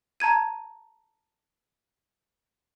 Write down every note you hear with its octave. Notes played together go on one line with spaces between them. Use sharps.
A5 A#5 G#6 D#7